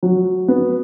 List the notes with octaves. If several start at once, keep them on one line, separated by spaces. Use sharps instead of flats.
F#3
B3